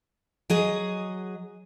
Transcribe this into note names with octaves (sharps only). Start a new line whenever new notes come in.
F#3 G#4 D#5